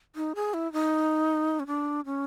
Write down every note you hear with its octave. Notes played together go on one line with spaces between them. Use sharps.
D#4
G#4
E4
D#4
C#4
D4
C#4